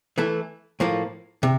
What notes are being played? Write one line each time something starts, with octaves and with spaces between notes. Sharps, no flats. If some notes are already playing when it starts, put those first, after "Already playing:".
E3 A3 E4 A4
A2 F3 A#3
C3